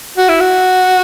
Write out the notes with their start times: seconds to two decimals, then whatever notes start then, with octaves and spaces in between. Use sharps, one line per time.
0.18 F#4
0.29 E4
0.40 F#4